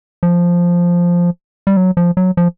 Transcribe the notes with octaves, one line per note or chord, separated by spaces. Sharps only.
F3
G3
F#3
F3
F#3
F3